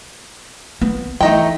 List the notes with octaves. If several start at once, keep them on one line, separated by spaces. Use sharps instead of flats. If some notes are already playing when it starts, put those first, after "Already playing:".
B3
E3 A3 D#4 G5